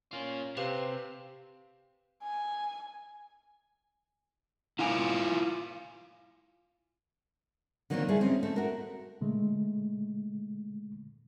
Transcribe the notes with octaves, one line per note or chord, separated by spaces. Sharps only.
A#3 C#4 F4
C3 C4 G4 B4 F5
G#5
E4 F4 F5 G#5
D3 D#3 F#3 A#3 C4 D5
G3 A3 E4 G#4
C4 C#4 D#4
A3
F#4 A#4
A#2 D3 G#3 A3